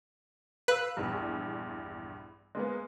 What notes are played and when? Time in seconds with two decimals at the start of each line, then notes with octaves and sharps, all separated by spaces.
0.68 B4 F5 E6
0.97 A#1 E2 G2
2.55 G#3 A#3 B3